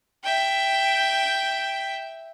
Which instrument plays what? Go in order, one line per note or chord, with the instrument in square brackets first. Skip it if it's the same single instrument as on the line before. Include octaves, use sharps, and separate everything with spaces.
[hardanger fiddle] E5 G5